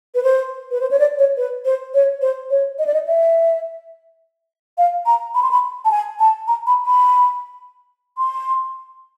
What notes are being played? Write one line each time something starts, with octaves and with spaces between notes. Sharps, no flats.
B4
C5
B4
C5
C#5
D5
C#5
B4
C5
C#5
C5
C#5
D#5
D5
D#5
E5
F5
A#5
B5
C6
B5
A5
G#5
A5
A#5
B5
B5
C6